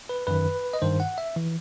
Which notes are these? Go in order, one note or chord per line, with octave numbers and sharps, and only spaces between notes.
B4
F#2 D#3 B4
D#5
G2 D#3 C5
F#5
E5
E3